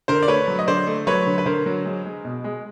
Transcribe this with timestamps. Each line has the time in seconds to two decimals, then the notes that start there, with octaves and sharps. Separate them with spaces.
0.08 D3 A#4 C5
0.23 D5
0.28 A3 B4 C#5
0.48 F#3
0.59 D#5
0.68 D3 C5 D5
0.87 A3
1.07 F#3 B4 C#5
1.26 D3
1.38 B4
1.46 D3 A#4 C5
1.66 F#3
1.86 G#3
2.05 G#3
2.25 B2
2.44 G#3